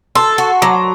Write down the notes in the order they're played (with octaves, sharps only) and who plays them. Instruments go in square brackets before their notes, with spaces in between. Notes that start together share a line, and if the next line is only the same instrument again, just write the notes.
[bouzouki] A4 [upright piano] A5 C6
[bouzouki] F#4
[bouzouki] F#3 [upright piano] A#5 D6